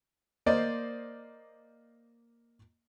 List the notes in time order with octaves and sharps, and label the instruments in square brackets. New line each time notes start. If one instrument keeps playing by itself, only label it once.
[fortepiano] A#3 C5 D5 D#5